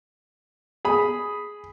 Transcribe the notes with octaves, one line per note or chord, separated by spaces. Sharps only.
G#4 B5